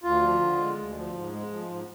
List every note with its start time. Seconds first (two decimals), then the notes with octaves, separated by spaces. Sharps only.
0.03 D2 F4
0.22 F3
0.41 D3
0.58 G#3
0.77 D2
0.96 F3
1.14 G#2
1.33 G#3
1.51 F3
1.69 G#2